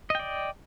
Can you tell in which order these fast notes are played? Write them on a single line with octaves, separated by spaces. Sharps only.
D#5 G5 D5